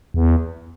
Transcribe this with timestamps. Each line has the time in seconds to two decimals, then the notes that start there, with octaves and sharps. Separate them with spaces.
0.14 E2